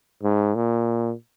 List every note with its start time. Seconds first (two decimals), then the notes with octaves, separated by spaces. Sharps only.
0.23 G#2
0.55 A#2